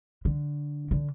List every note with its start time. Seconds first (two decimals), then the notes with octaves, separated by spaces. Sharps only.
0.25 D3
0.91 D3